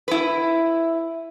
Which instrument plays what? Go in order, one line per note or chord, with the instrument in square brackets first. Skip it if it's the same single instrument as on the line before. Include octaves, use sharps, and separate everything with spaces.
[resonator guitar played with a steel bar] E4 B4